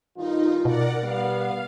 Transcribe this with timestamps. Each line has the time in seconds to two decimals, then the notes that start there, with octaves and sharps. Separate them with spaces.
0.17 G2 D#3 D#4 F4
0.65 B2 A#4 D5 F#5
1.03 G3 B3 F5